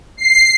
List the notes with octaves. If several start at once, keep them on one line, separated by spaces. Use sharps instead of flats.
C7